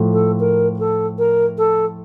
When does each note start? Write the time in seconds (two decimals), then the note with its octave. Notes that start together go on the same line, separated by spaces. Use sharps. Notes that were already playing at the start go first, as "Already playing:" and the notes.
Already playing: A2 F3 A3
0.13 A4
0.40 A#4
0.80 A4
1.18 A#4
1.58 A4